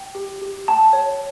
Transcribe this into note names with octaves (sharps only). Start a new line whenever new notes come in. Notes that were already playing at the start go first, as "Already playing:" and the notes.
Already playing: G5
G4
G4
G5 A5
C#5